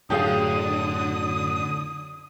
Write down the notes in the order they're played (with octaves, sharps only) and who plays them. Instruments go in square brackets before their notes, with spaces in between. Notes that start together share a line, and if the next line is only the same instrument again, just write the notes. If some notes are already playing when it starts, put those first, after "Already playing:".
[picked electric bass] F#2 A2 F#3 [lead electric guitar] D3 [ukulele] G4 G#4 F5 [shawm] D#6